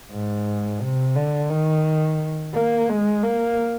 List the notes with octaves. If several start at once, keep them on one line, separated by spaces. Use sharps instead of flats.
G#2
C3
D3
D#3
A#3
G#3
A#3